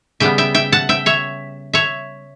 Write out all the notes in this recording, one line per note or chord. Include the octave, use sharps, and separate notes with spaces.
C#3 G3 B3 E5 G5
E5 G5
E5 G5
F#5 A5
E5 G5
C#5 E5
C#5 E5